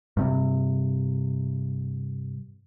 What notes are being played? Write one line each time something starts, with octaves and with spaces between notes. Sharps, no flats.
G2 C3